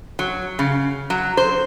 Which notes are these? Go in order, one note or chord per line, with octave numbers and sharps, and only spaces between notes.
F#3
C#3
F#3
C5